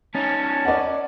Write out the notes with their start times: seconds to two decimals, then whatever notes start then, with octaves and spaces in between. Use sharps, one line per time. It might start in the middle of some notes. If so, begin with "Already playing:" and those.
0.15 C#4 D#4 A5
0.65 D5 D#5 F#5